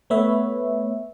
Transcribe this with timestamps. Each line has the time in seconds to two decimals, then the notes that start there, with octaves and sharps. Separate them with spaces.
0.10 A3 B3 B4 C#5 E5